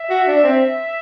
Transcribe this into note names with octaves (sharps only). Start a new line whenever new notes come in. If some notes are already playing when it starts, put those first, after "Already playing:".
Already playing: E5
F#4
D4
C4